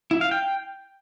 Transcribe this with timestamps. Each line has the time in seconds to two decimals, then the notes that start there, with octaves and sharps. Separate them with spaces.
0.11 E4
0.21 F5
0.31 G5